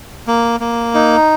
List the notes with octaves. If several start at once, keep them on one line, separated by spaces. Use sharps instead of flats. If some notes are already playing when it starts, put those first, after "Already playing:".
A#3
A#3
D#4